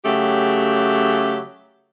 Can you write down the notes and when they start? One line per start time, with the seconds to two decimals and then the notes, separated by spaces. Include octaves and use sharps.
0.05 C#3 F#3 A3 G4